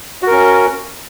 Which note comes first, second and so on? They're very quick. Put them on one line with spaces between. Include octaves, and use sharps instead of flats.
F#4 A#4 C#4